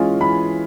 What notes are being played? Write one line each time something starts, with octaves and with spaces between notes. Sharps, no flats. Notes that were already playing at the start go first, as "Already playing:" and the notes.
Already playing: E3 G#3 C#4 F4
E3 B5